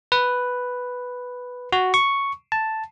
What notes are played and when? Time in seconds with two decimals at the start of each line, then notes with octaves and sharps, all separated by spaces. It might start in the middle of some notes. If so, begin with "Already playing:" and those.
0.12 B4
1.72 F#4
1.94 C#6
2.52 A5